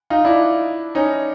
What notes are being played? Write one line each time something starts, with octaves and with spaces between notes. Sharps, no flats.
D#4 F4
D4 E4
C#4 D#4